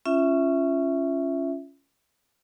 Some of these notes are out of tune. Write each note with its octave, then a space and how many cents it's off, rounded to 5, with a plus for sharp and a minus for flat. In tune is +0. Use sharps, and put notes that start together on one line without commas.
C#4 +0 F4 -25 E5 +0